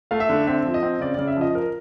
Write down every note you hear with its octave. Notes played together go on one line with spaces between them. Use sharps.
A3 F5
E5
D3
C4 E5
F3
D#5
C4
C#3 D5
C#3 D5
E5
F3 D#5
A#4